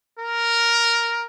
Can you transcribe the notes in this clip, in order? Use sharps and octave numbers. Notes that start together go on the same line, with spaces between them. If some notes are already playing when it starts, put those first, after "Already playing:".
A#4